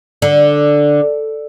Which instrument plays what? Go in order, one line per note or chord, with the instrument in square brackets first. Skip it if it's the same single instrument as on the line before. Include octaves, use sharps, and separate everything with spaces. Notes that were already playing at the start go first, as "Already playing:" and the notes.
[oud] D3